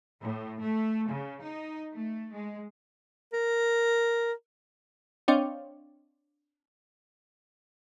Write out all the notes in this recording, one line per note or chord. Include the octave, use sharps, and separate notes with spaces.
A2
A3
C#3
D#4
A3
G#3
A#4
C4 D4 C#5 D#5 F5 G5